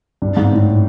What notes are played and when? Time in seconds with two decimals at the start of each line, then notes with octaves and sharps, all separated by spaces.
0.22 G2
0.37 G#2
0.52 A2